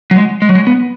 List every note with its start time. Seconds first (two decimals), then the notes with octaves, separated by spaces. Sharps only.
0.11 F#3
0.16 G#3
0.42 G#3
0.49 F#3
0.55 G#3
0.67 B3